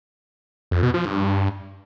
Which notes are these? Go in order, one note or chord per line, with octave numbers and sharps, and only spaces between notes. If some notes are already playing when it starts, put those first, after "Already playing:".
F2
B2
F3
G2